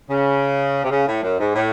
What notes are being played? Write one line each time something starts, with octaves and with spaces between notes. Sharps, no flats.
C#3
C3
C#3
A2
F#2
G#2
A2